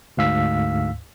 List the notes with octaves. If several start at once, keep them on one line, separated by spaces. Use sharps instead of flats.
D2 G#2 F5 E6 B6